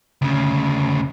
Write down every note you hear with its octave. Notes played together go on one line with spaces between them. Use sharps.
D2 C#3